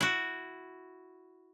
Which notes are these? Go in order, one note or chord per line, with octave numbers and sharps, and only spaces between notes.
E4 F#4